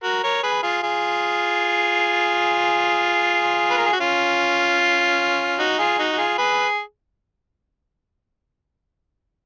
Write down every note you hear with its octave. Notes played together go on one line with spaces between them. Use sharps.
F#4 A#4
A#4 C#5
G#4 B4
F4 G#4
F4 G#4
B4
A#4
G#4
F#4
C#4 F4
D#4 F#4
F4 G#4
D#4 F#4
F#4
F4 G#4
G#4 B4